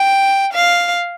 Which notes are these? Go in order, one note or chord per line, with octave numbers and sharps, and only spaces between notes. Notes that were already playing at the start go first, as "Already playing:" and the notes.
Already playing: G5
F5